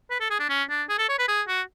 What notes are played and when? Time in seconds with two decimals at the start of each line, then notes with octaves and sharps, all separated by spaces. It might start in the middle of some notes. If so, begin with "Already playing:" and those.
0.10 B4
0.20 A4
0.30 G#4
0.39 D4
0.49 C#4
0.69 D4
0.89 G#4
0.98 A4
1.09 C#5
1.19 B4
1.28 G#4
1.48 F#4